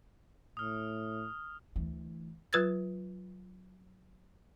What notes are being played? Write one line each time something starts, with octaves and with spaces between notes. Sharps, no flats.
A2 D#6 F6
D2 E3
F#3 F4 B4 E6 G#6 A6